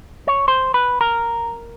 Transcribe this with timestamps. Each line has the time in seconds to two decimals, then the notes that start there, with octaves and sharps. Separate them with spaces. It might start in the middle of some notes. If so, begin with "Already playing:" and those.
0.28 C#5
0.48 C5
0.74 B4
1.01 A#4